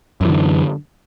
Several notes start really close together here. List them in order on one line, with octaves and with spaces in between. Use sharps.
F#2 E3 D3